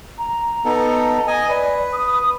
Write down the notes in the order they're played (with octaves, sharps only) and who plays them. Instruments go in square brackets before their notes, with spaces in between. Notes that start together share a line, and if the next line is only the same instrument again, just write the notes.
[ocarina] A#5
[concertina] B3 D#4 A4
D#5 G#5
[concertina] B4 [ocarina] D5
[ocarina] D#6